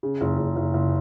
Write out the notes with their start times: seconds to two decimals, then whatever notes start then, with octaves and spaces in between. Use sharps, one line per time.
0.03 C#3
0.21 F#1
0.39 F#1
0.56 F#1
0.74 F#1